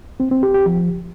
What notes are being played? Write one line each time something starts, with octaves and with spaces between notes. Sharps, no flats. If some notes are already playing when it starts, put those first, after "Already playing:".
C4
C4
G4
G4
F3